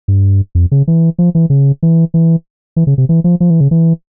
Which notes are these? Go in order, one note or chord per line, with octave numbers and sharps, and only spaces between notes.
G2
F2
C#3
E3
F3
E3
C#3
E3
E3
E3
C#3
C3
E3
F3
F3
E3
C#3
E3